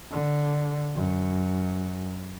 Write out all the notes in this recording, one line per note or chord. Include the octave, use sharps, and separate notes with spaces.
D3
F#2